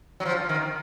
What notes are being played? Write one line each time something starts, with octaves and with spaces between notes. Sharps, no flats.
F#3
F3
D#3